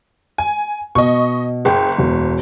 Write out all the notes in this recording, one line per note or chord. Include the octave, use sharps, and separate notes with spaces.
G#5
B2 D#5 C#6
F#1 G#4 G5
E1